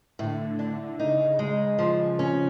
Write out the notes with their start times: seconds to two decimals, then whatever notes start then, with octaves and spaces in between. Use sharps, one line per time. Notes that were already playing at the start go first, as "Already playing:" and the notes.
0.19 A2 D3
0.59 D4
0.98 C#3 D#4
1.39 G#3
1.79 C#3 F3
2.19 C#4